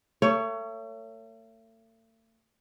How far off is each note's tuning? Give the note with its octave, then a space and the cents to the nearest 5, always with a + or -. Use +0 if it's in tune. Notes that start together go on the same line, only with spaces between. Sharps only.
A3 +40 C#5 +15